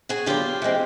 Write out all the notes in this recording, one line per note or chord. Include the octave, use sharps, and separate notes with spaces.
F#4 G#4
D3 F#3 B3 F4 G4
E3 G#3 C4